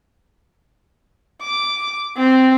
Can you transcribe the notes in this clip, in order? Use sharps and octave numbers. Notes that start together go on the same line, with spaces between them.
D6
C4